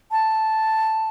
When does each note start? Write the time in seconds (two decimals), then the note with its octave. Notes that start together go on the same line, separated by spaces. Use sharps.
0.11 A5